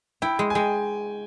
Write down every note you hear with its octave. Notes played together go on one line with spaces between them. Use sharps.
E4 G5
G#3
G#5
G#3 G5